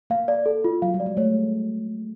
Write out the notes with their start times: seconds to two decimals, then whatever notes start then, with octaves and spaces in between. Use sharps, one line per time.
0.10 A#3 F5
0.28 D5
0.46 A4
0.64 F4
0.82 F#3 F5
0.94 G3
1.00 D5
1.06 G#3
1.17 A3 C#5